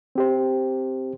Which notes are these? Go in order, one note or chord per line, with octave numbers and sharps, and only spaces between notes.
C4 G4 C5